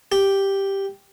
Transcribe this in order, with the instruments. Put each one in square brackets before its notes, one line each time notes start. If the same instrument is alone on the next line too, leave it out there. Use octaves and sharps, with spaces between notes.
[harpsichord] G4